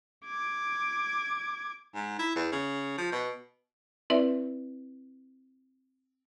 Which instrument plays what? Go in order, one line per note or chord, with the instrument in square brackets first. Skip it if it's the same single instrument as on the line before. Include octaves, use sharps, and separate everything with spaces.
[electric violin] D6 G#6
[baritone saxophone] G#2
E4
E2
C#3
F3
B2
[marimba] C4 E4 B4 D5 E5